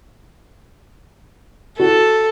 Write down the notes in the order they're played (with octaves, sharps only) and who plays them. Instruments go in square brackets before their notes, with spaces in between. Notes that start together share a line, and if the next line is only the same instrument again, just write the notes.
[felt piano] F#4 [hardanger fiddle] A4